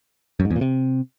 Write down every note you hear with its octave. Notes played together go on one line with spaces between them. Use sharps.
F#2
G#2
E2
A#2
C3